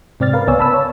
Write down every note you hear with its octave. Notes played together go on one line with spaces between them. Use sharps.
G#2 C3 C4 D5 F6 A6
A#4 B4 F5
C#2 B3 C#5 D5 G#5 E6
A5 B5 E6
C#5